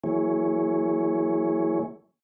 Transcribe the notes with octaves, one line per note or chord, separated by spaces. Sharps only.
E3 F#3 A#3 E4 G#4 C#5